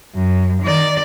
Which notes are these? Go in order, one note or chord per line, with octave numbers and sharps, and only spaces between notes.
F#2
D#3 D5